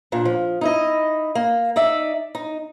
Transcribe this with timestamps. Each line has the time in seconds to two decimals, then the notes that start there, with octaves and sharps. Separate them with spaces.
0.12 A#2 D4
0.25 F3
0.61 D#4 E4 D#5
1.35 A#3
1.76 D#4 D5 E5
2.35 D#4